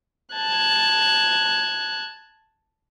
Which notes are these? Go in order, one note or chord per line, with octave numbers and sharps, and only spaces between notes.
A5 F#6 G#6